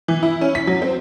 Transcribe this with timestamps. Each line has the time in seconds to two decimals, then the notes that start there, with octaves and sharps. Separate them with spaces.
0.08 E3
0.23 E4
0.41 C#4
0.55 B6
0.67 F#3
0.82 C4